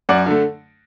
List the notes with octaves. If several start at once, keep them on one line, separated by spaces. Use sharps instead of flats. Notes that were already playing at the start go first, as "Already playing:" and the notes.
F#2 D5 F#5
D3 A3